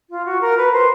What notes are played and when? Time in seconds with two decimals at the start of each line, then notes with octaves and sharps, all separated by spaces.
0.10 F4
0.25 F#4
0.41 A#4
0.57 B4
0.72 C5